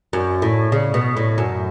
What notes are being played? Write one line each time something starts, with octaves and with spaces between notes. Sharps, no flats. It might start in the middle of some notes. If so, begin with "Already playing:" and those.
F#2
A2
C#3
B2
A2
F#2